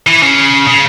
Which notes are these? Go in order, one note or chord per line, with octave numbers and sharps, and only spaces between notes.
E3
C#3
C#3